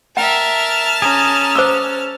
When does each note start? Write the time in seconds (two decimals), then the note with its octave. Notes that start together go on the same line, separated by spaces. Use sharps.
0.17 A#4 E5 G5 A5 F6
1.02 C#4 G#4 A#5
1.55 C5 D6 E6